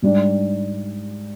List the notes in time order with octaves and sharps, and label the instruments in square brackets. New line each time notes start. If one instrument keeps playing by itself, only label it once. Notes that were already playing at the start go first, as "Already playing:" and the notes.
[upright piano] G#2 G3 D4